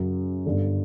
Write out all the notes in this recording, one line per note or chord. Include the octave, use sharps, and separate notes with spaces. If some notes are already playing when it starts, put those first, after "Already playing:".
Already playing: F#2 C#3 F#3
G1 G2 D3